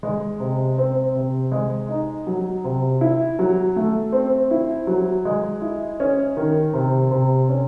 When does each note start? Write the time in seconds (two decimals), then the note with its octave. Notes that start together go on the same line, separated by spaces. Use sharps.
0.03 G#3
0.40 C3
0.78 C4
1.15 C3
1.52 G#3
1.89 D#4
2.27 F#3
2.64 C3
3.01 E4
3.39 F#3
3.76 A3
4.12 C4
4.51 E4
4.87 F#3
5.25 G#3
5.62 E4
6.00 C#4
6.37 D#3
6.73 C3
7.11 C3
7.49 C#4